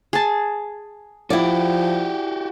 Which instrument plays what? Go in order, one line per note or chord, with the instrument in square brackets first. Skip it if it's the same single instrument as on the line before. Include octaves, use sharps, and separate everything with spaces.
[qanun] G#4 A5
[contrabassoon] F3 [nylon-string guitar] E4 D5 [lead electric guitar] F#4 G4